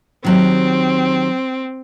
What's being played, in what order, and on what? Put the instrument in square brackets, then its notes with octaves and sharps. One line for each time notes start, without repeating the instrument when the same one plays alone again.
[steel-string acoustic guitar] D#3 F#3 G4 [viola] C4